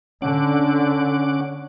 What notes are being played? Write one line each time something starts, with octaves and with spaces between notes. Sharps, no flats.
D3 C#4 F#5 D6